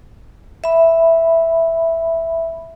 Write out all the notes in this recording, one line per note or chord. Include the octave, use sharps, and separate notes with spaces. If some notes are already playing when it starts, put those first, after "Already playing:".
E5 B5